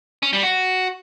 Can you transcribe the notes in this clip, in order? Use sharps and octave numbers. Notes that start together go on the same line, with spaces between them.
C#4
G3
F#4